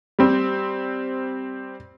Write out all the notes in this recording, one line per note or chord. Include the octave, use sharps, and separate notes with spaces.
G3 C4